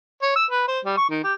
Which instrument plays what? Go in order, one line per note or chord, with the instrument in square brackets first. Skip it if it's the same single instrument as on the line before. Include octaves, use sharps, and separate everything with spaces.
[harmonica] C#5
E6
B4
C5
G3
C#6
D#3
G4